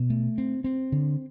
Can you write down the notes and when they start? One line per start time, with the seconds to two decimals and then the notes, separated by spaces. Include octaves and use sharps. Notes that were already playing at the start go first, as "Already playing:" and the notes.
Already playing: B2
0.10 A3
0.38 C4
0.64 C4
0.92 D3